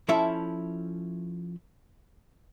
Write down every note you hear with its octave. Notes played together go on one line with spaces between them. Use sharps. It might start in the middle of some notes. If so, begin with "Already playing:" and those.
F3 C#4 E4 A4 E5